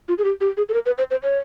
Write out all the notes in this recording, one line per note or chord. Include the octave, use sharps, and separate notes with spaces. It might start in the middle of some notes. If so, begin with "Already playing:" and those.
F4
G#4
G4
G4
G#4
A4
A#4
B4
C5
C5
C#5